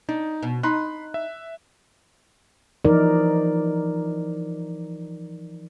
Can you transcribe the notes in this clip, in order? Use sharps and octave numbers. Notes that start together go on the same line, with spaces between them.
D4 D#4
B2
D#4 B5 C6 F#6
E5
E3 F3 D#4 A#4 D5